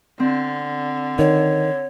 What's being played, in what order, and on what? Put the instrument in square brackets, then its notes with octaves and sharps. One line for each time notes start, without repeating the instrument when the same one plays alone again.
[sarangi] D3 [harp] C4
[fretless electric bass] D#3 [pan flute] C#5